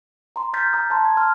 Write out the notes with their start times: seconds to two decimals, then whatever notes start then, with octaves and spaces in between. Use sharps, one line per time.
0.36 A#5 C6
0.53 A#5 F6 G6 A6 B6
0.73 A#5 D#6
0.90 A5 A#5 C6
1.05 G#6
1.17 C6 F6